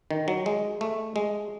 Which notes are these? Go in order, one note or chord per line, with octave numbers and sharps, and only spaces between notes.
D#3
F#3
G#3
A3
G#3